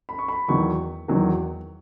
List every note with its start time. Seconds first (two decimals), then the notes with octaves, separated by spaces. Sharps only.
0.09 B5
0.19 C#6
0.28 B5
0.48 E2 D#3 F#3 C#6
1.08 E2 D#3 F#3